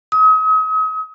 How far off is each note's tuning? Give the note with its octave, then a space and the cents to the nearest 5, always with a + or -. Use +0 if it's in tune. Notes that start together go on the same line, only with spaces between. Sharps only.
D#6 +40